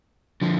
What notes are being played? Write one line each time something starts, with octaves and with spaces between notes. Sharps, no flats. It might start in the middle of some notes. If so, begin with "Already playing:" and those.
D3 F3